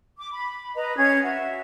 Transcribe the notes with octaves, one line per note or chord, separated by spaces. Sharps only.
D6
B5
B4 D#5 A#5
C#4 G#4 G#6
F#4 E5